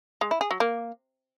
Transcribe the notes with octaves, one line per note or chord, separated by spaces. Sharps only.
G#3
E4
G#4
F#3
A#3